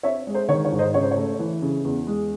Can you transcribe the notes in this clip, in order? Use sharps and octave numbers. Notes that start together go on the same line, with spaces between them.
C4 C#5 E5
G#3
C5
D#3 C#5
C#5
G#2
C5 D#5
C#3 C#5
C5
C#5
A3
E3
C#3
E2
G#3